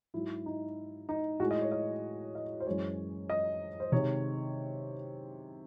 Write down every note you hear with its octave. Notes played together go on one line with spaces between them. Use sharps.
G#2 F#3 E4
D#4
D#4
A2 G#3 F#4
D#5
C#5
D#5
D#5
C5
F#2 E3 G#3 C#5
D#5
C5
C3 D#3 G#3 C#5